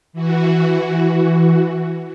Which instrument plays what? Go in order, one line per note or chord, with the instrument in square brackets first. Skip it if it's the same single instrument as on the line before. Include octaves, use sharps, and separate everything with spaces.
[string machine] E3 F#4